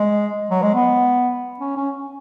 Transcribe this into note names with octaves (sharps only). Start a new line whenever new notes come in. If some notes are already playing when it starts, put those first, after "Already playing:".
Already playing: G#3
F#3
G#3
B3
C#4
C#4